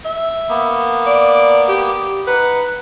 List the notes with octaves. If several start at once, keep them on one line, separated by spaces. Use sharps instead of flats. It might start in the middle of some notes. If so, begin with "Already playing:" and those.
E5
A#3 B3
D5
G4
D#4 B4 F#5